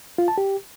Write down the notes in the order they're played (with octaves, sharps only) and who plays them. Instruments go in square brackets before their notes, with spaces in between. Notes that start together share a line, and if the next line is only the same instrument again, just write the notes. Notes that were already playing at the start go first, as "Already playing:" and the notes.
[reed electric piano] F4
A5
G4